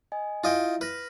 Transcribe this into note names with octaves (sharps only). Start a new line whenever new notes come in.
D#5 G#5
E4 F4 D#5 E5 G5
B4 F6 A#6